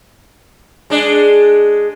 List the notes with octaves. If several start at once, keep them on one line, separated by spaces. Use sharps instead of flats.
G#3 D4